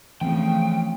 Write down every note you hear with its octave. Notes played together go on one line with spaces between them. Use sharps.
C#3 E3 F3 A3 B3 C4 G5